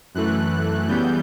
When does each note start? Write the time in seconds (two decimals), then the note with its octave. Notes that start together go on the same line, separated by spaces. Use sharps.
0.15 F#2 E3 A3 F#6
0.88 C#3 E3 G3 B3 G6